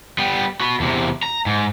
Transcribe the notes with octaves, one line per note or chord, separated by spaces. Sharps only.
G3 B3
F#4 B5
E2 C3
A#5
G#2